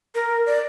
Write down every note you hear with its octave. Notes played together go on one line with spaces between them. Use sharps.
A#4
D5